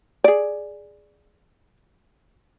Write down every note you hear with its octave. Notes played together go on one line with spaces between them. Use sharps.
G#4 D5